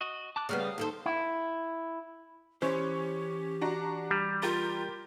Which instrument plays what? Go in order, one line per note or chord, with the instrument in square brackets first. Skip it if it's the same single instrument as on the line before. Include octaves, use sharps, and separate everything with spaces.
[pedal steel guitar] F#4 D#5
A5 D6 F#6
[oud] C#3 G3 B3 [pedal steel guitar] A#3 F6 F#6
[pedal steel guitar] F5 D#6
[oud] D#2 A4 C5
[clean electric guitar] E4
[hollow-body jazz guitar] E3 C5 [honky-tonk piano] C#4 C#5 [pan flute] G4
[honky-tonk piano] D4 F#4 A#5
[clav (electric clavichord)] G3
[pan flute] F4 [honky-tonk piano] G4 A#4 A6